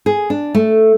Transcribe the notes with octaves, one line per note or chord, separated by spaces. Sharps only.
G#4
D4
A3